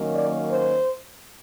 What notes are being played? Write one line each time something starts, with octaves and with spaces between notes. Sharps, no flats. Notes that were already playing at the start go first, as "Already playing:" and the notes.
Already playing: D#3 F#3 A#3 C#4
D5
C5